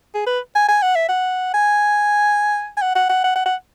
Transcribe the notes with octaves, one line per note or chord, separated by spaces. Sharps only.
G#4
B4
G#5
G#5
F#5
E5
F#5
G#5
G#5
F#5
F#5
F#5
F#5
F#5
F#5